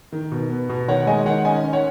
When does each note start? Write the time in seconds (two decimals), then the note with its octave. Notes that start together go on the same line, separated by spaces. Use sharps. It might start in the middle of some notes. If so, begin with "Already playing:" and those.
0.12 D#3
0.32 B2
0.50 B3
0.69 B2
0.88 D#3 C#5 F#5
1.07 G#3 D#5 G#5
1.26 D#3 C#5 F#5
1.45 C#4 D#5 G#5
1.64 C#4
1.73 C#5 F#5